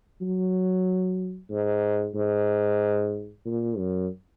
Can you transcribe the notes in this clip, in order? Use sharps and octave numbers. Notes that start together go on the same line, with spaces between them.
F#3
G#2
G#2
A#2
F#2